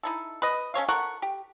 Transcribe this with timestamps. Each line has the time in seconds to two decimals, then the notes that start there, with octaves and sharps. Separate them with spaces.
0.03 D#4 E4 A4
0.42 B4 D#5
0.74 C#4 A4 C#5 F5
0.88 A4 A#4 F#5 C#6
1.22 G4